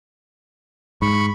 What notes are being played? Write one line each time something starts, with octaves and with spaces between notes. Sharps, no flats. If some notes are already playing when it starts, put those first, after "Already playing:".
G#2 B5 C#6